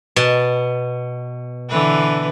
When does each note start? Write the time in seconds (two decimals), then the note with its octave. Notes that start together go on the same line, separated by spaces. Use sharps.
0.16 B2 A5
1.70 D3 E3 B4